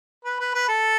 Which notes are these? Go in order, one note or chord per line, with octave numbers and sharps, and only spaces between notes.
B4
B4
B4
A4